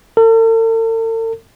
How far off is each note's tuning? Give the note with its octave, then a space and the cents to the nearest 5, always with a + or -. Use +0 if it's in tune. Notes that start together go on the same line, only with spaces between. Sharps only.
A4 +45